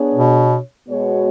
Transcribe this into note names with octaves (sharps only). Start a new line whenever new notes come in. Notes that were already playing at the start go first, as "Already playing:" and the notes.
Already playing: B3 D4 G#4 C#5
B2
B2 G#3 B3 F#4 C#5